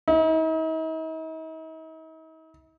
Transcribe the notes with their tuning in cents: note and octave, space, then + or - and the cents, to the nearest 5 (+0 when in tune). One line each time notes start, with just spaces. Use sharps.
D#4 +45